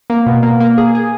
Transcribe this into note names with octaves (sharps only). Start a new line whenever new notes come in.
A#3
B2
A#3
A#3
G#4
G#4